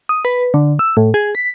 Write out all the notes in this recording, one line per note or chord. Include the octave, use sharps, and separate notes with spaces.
D#6
B4
D3
E6
A2
G#4
B6